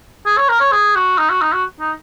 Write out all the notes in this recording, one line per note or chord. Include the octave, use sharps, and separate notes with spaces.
G#4
C#5
A#4
C#5
G#4
F#4
D#4
F#4
D#4
F#4
D#4